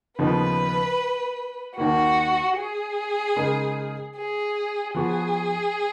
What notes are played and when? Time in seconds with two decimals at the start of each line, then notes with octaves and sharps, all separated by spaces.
0.19 D#2 C#3 F3 B3 D#4 B4
1.77 D#2 D#3 A#3 F#4
2.57 G#4
3.36 C#3 G#3 D#4 A#4
4.16 G#4
4.95 F3 B3 F#4 G#4